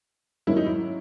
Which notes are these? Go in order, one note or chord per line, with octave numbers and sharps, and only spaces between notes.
G#2 D#3 F#3 A#3 C#4 E4
D#4
E4